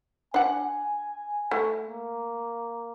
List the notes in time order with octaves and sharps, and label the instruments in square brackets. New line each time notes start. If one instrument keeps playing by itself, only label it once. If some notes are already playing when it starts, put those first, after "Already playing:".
[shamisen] D4 F#5 [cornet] G#5
[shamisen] A3
[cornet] A#3